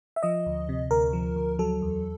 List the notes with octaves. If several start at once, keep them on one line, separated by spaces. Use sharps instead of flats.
E5
F3 D#5
D2
C3
D2 A#4
F3
D2
F#3 A4
E2